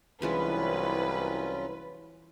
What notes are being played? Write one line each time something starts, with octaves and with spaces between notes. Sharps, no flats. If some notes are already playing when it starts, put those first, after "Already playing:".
C2 E3 F#3 G#3 C#4 D4 F4 B4